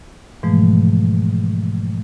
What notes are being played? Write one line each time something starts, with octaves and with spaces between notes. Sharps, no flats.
G#2 B2 E3 F3 G#3 A3